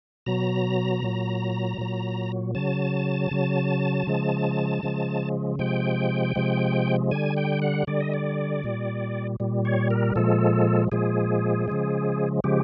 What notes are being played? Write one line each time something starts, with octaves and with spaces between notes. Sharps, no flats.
B2 F#3 A#5
A#2 F#3
A#2 F#3
C#3 F#3 A5
C#3 F#3
C#3 F3 G#3
C#3 F3 G#3
C3 F3 G#3 G5
C3 F3 G#3
D3 G3 G#5
G5
F#5
D3 G3 D5
D#5
D5
A#2 G3
A#2 G3
C#5
A#4
A#2 F3 G#3 A4
A#2 F3 G#3 G#4
C#3 F3 G#3
C#3 F3 G#3 G4